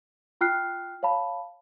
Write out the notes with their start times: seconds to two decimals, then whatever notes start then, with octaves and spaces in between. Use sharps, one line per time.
0.41 F4 G5 F6 F#6 C7
1.03 C#5 F5 A5 B5